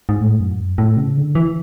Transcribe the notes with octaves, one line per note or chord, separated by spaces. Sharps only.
G#2
A2
F#2
A2
C#3
D3
E3